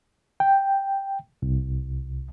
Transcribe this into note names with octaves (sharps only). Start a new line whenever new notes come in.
G5
C2